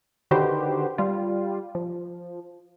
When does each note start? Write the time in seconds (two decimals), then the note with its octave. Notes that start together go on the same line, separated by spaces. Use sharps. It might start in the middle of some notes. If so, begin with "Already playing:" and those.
0.31 D3 D#3 F#4 G4 B4 C5
0.98 G3 F4
1.75 F3